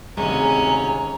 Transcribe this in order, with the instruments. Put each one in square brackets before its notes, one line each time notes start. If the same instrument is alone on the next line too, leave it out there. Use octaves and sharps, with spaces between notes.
[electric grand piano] G#1 D2 C3 [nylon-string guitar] G#3 [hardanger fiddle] C#4 [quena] A#5